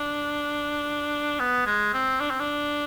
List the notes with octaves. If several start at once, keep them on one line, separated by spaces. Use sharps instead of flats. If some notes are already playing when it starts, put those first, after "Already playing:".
Already playing: D4
B3
G#3
C4
D4
C4
D4